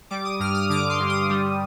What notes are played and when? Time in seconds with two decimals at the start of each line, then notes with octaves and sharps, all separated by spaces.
0.10 G3 D6
0.25 D#6
0.39 G2 F6
0.54 D#6
0.69 D3 D6
0.90 C6
1.00 G2
1.10 D#6
1.30 G3